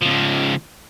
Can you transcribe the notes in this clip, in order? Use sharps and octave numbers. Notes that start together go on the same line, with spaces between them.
C#2 F3